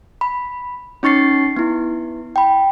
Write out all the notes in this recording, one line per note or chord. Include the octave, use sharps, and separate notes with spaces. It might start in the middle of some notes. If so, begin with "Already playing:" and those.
B5
C#4 D#4 C#6 A6 C7
B3 E4
G5 B5